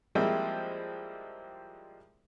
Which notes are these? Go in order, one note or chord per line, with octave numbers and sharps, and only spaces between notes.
F3 G3 G#3 A#3 C4 E4